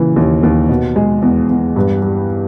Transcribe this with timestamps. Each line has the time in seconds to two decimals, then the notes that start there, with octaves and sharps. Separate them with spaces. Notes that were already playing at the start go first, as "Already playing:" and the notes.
Already playing: A#2 C#3 E3
0.16 D#2
0.43 D#2
0.69 B2
0.96 G#3
1.22 E2
1.50 E2
1.76 G2
2.02 G3